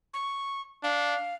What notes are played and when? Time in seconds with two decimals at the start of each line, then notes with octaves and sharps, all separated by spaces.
0.14 C#6
0.84 D4 F5